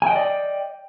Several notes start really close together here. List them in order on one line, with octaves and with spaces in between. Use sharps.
G#5 G5 D#5 D5